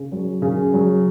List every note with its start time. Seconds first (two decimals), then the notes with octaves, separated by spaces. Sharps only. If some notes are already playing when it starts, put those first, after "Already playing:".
Already playing: C#3
0.12 F#3
0.42 C#3
0.74 F#3